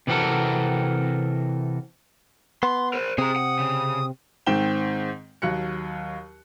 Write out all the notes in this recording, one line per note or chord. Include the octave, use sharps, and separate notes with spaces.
C3 E3 C4 F#4 A4 A#4
B3 C6
A#4 C5
C3 C4 G#4 A#5 D#6
F#5
C#3
G#2 D#3 C4 G5 E7 G7
D#2 F#3 F#6 C#7